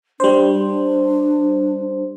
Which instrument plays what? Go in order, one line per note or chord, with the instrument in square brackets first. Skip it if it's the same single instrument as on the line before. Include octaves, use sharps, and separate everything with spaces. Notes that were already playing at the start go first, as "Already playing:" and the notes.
[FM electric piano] G3 C5 [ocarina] D4